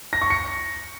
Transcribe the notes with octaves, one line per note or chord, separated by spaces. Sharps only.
A#6
C#6
C#7